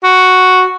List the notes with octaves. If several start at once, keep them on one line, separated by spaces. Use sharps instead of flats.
F#4